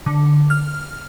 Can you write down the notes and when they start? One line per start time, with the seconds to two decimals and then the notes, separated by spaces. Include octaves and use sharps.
0.06 D3
0.50 F6